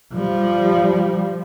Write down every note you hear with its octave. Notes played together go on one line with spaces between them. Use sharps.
F3 G3